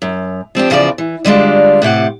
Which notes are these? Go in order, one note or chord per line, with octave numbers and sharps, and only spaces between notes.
F#2
F3 C4 D4 G4
E2 C#3 F3 F4 B4 D5
E3
D3 G3 G#3 D4 F4
A2 C3 G4 F#5